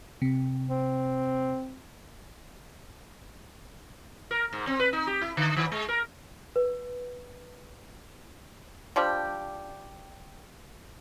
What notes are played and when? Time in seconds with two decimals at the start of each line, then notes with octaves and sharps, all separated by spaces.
0.22 C3
0.67 C4
4.31 A#4
4.53 G#2
4.67 C4
4.80 B4
4.93 D#4
5.07 G4
5.21 E4
5.37 D3
5.57 D#3
5.72 G#3
5.89 A#4
6.56 B4
8.96 F3 G3 D4 G4